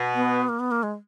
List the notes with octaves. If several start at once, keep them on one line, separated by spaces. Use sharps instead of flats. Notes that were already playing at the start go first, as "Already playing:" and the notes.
Already playing: B2
B3
A#3
B3
A#3
G#3